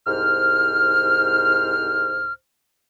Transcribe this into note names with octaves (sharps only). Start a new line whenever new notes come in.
C2 G#2 C5 F6